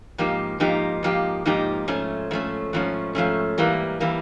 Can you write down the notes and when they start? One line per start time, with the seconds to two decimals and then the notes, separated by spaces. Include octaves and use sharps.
0.18 G#2 F3 A#3 D#4 G4
0.60 G#2 F3 A#3 D#4 G4
1.03 G#2 F3 A#3 D#4 G4
1.45 G#2 F3 A#3 D#4 G4
1.88 G#2 F3 A3 C#4
2.31 G#2 F3 A3 C#4
2.73 G#2 F3 A3 C#4
3.15 G#2 F3 A3 C#4
3.58 G#2 E3 G3 A#3
4.00 E3 G3 A#3